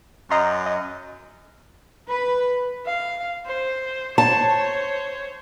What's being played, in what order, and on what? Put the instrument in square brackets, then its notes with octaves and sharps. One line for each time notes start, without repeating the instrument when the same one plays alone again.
[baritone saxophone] F#2 [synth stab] D#5 A#5 C6
[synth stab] D#5
[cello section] B4
[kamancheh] F5
C5
[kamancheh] C5 C#5 [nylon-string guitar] A5